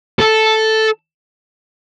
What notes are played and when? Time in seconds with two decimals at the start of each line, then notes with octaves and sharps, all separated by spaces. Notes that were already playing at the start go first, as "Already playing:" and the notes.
0.19 A4